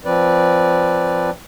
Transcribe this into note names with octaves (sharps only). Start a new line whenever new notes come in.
F3 C4 B4 D5